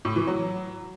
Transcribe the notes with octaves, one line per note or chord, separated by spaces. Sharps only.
A2
E3
F#3